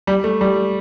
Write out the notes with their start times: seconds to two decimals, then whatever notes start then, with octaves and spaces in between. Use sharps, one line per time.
0.07 G3
0.24 A3
0.41 G3